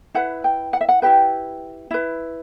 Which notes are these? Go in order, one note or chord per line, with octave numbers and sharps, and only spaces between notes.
E4 B4 F#5
G5
F#5
E5
F#5
E4 G4 B4 G5
E4 B4